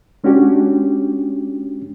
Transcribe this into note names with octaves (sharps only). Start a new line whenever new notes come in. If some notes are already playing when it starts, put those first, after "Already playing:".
G#3 C#4 D4 F#4 G4